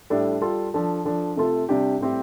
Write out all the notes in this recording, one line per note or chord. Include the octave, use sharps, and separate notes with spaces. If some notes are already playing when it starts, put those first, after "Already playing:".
A2 G3 D4 A4
G3 F4 A4
F3 D4 A4
F3 D4 A4
C3 A3 F4 A4
C3 G3 D4 G4
A2 G3 C4 G4